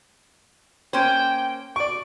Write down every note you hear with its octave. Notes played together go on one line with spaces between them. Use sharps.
A#3 C#4 C5 G5
D5 C#6 D7